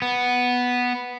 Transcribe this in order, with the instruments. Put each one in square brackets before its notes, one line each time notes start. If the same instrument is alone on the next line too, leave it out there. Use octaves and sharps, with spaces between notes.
[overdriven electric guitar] B3